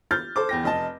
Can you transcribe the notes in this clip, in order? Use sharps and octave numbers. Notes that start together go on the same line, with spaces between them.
F6 G6 A6
A4 C5 D6
E2 G5 A#6
F1 D#5 A5